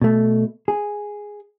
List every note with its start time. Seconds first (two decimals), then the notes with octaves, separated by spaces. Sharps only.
0.02 B2 A3
0.68 G#4